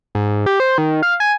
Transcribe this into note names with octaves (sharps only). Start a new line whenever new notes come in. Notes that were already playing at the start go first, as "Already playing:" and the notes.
G#2
G#2
G4
C5
D#3
F5
G#5